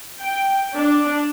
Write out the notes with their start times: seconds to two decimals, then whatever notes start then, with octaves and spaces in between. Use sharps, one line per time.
0.20 G5
0.76 D4